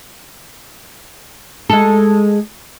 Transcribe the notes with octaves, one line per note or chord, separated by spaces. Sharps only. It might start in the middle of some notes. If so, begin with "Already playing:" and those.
G#3 A4